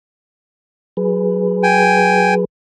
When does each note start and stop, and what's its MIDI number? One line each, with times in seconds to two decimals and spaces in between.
0.97 2.45 54
0.97 2.45 68
0.97 2.45 71
1.63 2.34 79
1.63 2.34 80